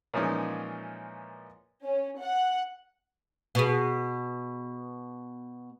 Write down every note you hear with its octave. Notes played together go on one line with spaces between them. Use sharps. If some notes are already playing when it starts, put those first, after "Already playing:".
A#2 E3 F3 G#3 C#4 D#4
C#4
F#5
B2 G#4